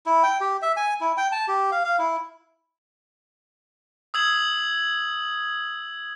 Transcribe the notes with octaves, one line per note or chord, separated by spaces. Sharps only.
E4
G5
G4
E5
G#5
E4
G5
A5
G4
F5
F5
E4
D#6 E6 G#6 F#7